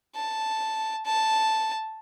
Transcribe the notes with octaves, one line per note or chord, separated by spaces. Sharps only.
A5
A5